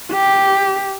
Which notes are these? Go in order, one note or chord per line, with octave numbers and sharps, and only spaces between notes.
G4